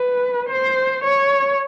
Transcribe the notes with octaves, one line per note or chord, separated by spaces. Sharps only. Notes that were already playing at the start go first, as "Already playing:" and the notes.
Already playing: B4
C5
C#5